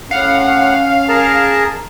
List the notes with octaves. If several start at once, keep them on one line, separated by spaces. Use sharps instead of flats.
A2 C#4 F5 F#5
G#4 A#4 A5